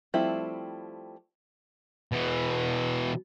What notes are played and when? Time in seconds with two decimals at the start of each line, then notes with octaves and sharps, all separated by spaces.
0.14 F3 G3 A3 C4 E4
2.12 B2 E3